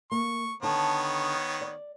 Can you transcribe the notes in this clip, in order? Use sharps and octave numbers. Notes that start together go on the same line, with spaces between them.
A#3 C#6
D3 D#3 B3 C#5 A5
D5